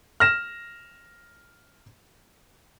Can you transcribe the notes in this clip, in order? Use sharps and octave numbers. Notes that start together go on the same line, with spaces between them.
F6 A#6 E7